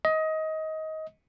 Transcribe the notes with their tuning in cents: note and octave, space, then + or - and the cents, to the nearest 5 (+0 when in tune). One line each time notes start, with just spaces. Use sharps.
D#5 +20